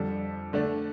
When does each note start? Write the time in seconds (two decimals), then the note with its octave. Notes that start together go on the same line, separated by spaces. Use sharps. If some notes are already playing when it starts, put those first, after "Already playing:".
Already playing: F2 D3 G3 D4 A4
0.53 D3 A3 D4